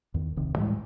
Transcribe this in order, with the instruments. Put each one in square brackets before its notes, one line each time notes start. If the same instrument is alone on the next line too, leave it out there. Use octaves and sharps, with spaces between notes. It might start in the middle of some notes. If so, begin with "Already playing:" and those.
[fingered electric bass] E2 D#3
D#1 C2 C3 D#3
A2 E3 G3 G#3